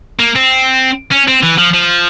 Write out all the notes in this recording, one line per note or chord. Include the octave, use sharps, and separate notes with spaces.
A#3
C4
C#4
C4
E3
F3
F3